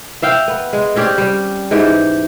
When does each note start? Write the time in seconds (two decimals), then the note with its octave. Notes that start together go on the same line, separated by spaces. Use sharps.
0.22 E5 F5 G5
0.48 B3
0.73 G#3
0.96 C4 C#4 G4 D5
1.18 G3
1.71 G#2 E3 G4